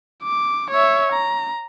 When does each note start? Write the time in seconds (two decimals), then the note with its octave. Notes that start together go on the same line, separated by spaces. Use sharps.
0.23 D6
0.71 C#5 E5
1.12 A#5